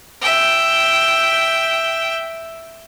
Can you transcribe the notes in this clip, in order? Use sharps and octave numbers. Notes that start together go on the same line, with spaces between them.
E5 G5